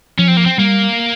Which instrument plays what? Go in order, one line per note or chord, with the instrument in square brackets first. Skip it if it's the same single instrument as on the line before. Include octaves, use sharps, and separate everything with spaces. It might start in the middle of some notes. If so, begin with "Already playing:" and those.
[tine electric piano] F3 [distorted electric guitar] C#4
[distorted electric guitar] C4
A#3
C4
[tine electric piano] G3 [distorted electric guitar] A#3